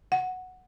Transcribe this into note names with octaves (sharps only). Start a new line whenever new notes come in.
F#5